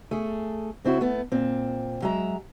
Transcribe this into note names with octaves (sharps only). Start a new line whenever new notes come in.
A3 G#4
C#3 C4 E4 F#4
A3 B3
A#2 C4
F#3 G#3 E5 A#5